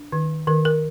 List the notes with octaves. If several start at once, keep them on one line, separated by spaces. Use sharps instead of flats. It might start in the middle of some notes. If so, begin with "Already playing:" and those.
Already playing: D4
D#3
D#3 A#4
A#4